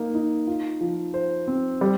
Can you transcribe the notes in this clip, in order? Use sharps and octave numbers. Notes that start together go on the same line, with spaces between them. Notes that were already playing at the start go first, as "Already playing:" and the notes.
Already playing: A#3 D#4
D#4
F4
F3
C5
C4
G3